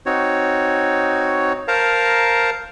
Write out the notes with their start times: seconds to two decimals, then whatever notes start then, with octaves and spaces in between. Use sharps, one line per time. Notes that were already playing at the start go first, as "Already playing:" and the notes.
0.06 C4 D#4 F#4 C#5
1.68 A#4 C5 F5 A5 A#5